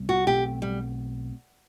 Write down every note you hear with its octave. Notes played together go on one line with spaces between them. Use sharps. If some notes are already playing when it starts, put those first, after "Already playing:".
Already playing: C2 G3 B3
F#4
B1 B2 A3 C4 G4
G3